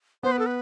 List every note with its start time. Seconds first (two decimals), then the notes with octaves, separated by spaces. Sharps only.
0.23 B3 C5
0.32 B4
0.39 A4
0.46 B4